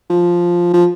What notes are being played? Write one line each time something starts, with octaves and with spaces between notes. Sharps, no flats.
F3
F3